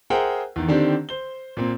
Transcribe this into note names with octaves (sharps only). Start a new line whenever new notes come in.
G#4 A#4 C5 E5 F#5 G5
E2 D#3
D3 D#3 C4 D4 G4
C5 G7
A#2 A#3 C4